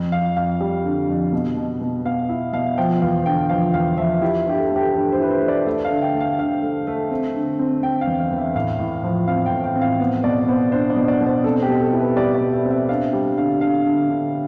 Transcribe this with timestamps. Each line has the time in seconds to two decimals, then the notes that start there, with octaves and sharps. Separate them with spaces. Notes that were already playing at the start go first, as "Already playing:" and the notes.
Already playing: F2
0.12 F2 F5
0.36 F2 F5
0.60 G3
0.85 D3
1.09 F2
1.33 B2
1.57 B2
1.81 B2
2.05 B3 F5
2.29 E4 E5
2.53 B2 F5
2.78 F3 G5
3.02 E2 F5
3.25 D3 G5
3.49 F3 F5
3.73 E2 F5
3.97 F3 E5
4.22 E4 G4
4.46 G2 G4
4.58 A4
4.70 A3
4.76 G4
4.94 G2 A4
5.12 C5
5.18 E4 B4
5.30 C5
5.42 A3
5.48 D5
5.66 A3 E5
5.85 F5
5.90 D3
6.02 G5
6.15 A3
6.20 F5
6.39 D3 F5
6.63 A3
6.87 A3
7.11 C4
7.35 D3
7.59 C4
7.83 C4 G5
8.01 F5
8.07 E2
8.19 F5
8.31 E2
8.37 E5
8.56 A2 F5
8.79 A2
9.04 F3
9.27 C4 F5
9.46 G5
9.52 A2
9.64 G5
9.76 C4
9.81 F5
10.00 B3
10.24 B2 D5
10.48 B3 C5
10.72 D4 C5
10.90 D5
10.96 B2
11.08 D5
11.21 B2
11.26 C5
11.44 C4 A4
11.62 G4
11.69 B2
11.80 A4
11.92 E4
11.99 B4
12.16 G3 D5
12.35 D5
12.41 B2
12.53 E5
12.65 C4
12.71 E5
12.89 D4 F5
13.13 G3
13.37 D3 F5
13.61 D3 F5
13.86 D3
14.10 D3